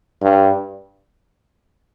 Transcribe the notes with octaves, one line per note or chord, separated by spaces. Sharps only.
G2